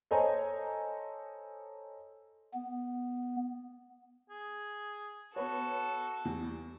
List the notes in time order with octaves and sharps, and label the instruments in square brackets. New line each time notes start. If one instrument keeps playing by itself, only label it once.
[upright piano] A4 C5 C#5 D#5 G#5 A#5
[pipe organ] B3
[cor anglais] G#4
[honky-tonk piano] B3 B4 C#5 [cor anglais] F#4 [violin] A4
[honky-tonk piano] E2 G3